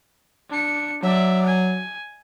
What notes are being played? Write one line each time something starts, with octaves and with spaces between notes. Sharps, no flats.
D4 C#7
F#3 D5 E5
G#5